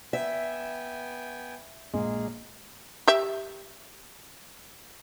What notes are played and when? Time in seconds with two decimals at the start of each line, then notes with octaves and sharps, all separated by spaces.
0.13 B3 E5 G5 G#5
1.94 A#1 G#3 A#3 G#4
3.07 G4 E5